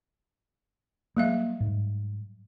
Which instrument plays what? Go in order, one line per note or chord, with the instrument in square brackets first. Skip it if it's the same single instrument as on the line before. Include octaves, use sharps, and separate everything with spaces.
[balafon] F#3 G3 E5 [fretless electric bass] A#3
[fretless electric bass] G#2